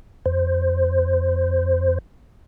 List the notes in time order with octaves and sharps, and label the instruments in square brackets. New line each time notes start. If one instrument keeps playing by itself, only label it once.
[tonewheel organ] F2 C5